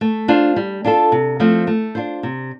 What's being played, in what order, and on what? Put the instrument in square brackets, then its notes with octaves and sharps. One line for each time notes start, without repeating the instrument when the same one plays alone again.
[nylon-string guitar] A3
D4 F4 C5
G3
D4 F4 A4
C3
F3 A3 C4
A3
D4 F4 C5
C3